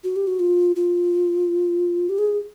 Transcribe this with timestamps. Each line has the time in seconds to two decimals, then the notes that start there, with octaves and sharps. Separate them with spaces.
0.04 F#4
0.16 G4
0.27 F#4
0.40 F4
0.76 F4
2.09 G4
2.18 G#4